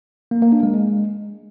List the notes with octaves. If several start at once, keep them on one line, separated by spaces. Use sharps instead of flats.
A#3
A#3
D4
G#3
G#3